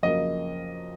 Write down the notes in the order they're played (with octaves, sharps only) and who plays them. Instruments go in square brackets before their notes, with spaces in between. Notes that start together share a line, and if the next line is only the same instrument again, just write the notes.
[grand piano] F2 C#3 F#3 A#3 D#5